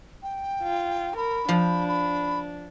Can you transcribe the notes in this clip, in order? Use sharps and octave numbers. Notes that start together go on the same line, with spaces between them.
G5
F4
A#4 B5
F3 D4
B5